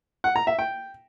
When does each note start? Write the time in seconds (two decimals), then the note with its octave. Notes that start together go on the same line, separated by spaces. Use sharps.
0.24 F#5
0.36 A#5
0.47 E5
0.59 G5